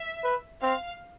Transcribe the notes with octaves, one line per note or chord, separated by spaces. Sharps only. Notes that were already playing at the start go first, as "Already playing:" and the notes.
Already playing: E5
B4
C4 F5